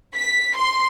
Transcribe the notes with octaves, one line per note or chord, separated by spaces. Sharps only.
B6
C6